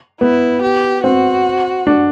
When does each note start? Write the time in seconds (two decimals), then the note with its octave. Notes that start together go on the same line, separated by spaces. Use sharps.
0.21 B3 E4
0.62 G4
1.04 C4 F#4
1.87 D4